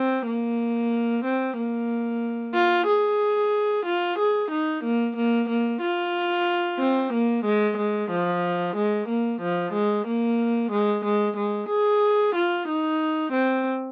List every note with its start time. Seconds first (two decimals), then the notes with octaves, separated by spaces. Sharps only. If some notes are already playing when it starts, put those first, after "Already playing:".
Already playing: C4
0.26 A#3
1.25 C4
1.57 A#3
2.55 F4
2.87 G#4
3.86 F4
4.18 G#4
4.51 D#4
4.84 A#3
5.16 A#3
5.49 A#3
5.81 F4
6.79 C4
7.13 A#3
7.45 G#3
7.77 G#3
8.11 F3
8.76 G#3
9.08 A#3
9.41 F3
9.73 G#3
10.07 A#3
10.71 G#3
11.05 G#3
11.37 G#3
11.69 G#4
12.35 F4
12.68 D#4
13.33 C4